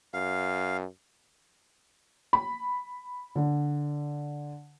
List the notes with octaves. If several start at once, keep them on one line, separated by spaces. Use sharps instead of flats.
F#2 F5
B5
D3